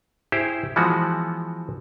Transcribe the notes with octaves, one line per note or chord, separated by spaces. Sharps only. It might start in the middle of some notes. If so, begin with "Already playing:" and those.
E4 G4 G#4 C5
E3 F3 G#3 B3 F#4